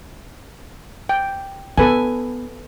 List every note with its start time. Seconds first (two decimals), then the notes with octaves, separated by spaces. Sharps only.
1.09 G5
1.78 B3 A4 B4 G#5